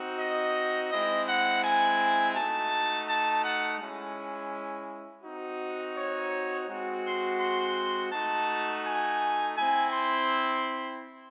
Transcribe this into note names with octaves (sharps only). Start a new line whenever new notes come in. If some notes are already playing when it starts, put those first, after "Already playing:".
Already playing: C4 D#4 F#4
D#5
G#3 C4 E4 D#5
F#5
G#5
A3 D#4 F#4 A5
A5
F#5
G#3 C#4 E4
C4 D#4 F#4
C#5
G#3 C4 F#4
C6
C6
A3 D#4 F#4 A5
G#5
C4 E4 G#5
C6